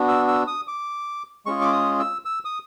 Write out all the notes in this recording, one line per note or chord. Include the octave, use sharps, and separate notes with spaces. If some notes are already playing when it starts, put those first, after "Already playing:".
Already playing: B3 D4 F#4
E6
E6
D#6
D6
G#3 C#4 F4 G#4 C#6
D6
D#6
E6
E6
D#6